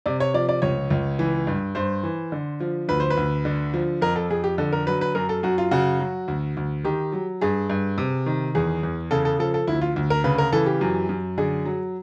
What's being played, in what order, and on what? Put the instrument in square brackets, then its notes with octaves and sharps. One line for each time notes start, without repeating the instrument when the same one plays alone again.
[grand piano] C3 D5
C#5
F3 D5
D5
C#2 C#5
C#2
E3
G2
G2 C5
E3
D3
F3
D2 B4
C5
B4
D2
D3
F3
F2 A#4
A4
F2 G#4
G4
D3 A4
A#4
F#3 B4
B4
F#2 A#4
A4
F#2 F#4
F4
C#3 F#4
F#3
D2
D2
D#3 G4
F#3
G2 G#4
G2
C3
D#3
E2 G#4
E2
C#3 A4
A4
F3 A4
A4
D2 E4
F4
D2
A#4
C#3 B4
A#4
E3 A4
G4
F#2
F#2
D3 G#4
F#3